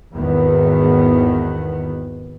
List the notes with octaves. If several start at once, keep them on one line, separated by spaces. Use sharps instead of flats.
G#1 E2 D#3 B3